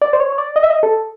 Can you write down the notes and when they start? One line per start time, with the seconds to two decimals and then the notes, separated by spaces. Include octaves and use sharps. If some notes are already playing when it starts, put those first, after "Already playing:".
0.02 D5
0.13 C5
0.20 C#5
0.32 C#5
0.38 D5
0.56 D#5
0.63 E5
0.70 D#5
0.83 A4